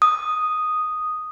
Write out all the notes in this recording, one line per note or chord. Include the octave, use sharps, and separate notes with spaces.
D#6